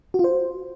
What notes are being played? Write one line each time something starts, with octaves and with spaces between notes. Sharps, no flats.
F#4
F4
C5